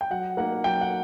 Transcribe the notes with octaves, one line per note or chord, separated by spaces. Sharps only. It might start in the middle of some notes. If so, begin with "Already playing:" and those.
G5
F#3 F#5
A#3 D#4 F#5
F#3 G5
F#5